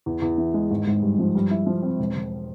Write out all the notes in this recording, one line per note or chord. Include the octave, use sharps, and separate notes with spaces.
E2
E2
E3
G#3
G#1
G#1
G2
F3
G2
E4
F3
C4
E1
E1